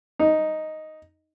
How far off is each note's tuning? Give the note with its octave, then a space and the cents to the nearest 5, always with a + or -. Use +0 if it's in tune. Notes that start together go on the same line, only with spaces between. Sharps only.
D#4 +0